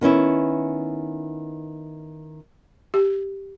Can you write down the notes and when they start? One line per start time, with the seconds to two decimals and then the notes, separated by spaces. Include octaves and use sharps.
0.01 D#3 B3 C#4 E4
2.94 G4